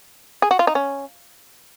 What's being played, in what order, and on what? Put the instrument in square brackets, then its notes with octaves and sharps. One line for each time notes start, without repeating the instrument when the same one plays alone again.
[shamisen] G#4
F#4
F4
D#4
C#4